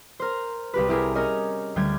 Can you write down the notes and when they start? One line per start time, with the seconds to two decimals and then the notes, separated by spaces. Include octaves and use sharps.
0.19 A#4 C5
0.74 C2 G4 B4
0.89 E4 G4 G#4 A#4
1.15 C#4 A#4 C#5 D#5
1.76 D2 G3 G6 G#6